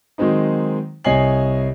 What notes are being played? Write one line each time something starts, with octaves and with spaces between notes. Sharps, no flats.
D#3 F#3 G#3 C4 D#4
C2 C#5 D#5 G#5 C7 F#7